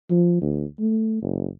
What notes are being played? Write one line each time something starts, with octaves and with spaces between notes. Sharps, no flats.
F3
D2
A3
F#1